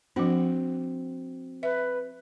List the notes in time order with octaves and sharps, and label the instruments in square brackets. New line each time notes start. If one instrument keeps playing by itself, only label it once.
[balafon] F3 D4 [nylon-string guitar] C4 F#4
[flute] B4 [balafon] E5